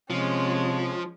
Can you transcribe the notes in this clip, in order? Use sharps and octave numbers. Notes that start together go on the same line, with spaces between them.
C3 F3 G#3 C#4